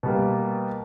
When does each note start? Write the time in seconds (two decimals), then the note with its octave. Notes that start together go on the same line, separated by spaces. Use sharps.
0.03 B2 G3 A#3